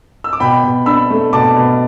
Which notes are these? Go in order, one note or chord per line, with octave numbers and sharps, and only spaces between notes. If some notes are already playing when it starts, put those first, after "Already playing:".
E6
D6
B2 G5 B5
B2
D4 B5 E6
A3
B2 A5 D6
B2